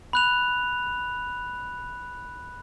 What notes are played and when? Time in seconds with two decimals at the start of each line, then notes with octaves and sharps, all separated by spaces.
0.13 B5 F#6 F7